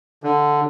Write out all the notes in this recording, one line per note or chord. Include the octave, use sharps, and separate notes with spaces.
D3